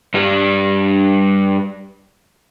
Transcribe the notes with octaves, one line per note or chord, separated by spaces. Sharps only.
G2 G3